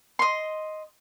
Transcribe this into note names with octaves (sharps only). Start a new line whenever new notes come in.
D#5 C6